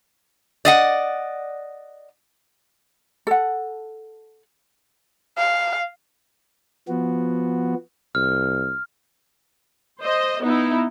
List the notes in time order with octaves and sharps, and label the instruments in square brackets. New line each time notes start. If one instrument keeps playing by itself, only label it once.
[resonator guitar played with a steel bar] D5 D#5 F#5
[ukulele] A4 F#5
[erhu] F5
[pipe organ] F3 B3 F#4
[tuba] C2 [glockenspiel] F6
[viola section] C5 D#5
B3 D#4 E4